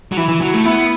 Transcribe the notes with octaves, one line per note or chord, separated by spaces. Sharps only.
F#3
E3 E4
E3
F#3
A3
B3 E4